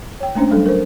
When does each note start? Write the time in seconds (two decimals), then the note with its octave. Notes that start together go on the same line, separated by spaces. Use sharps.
0.20 C#5 G5
0.35 A3 A#3 C#4 D4 C5
0.51 F#3 G3 D4 A4
0.66 A#4 C5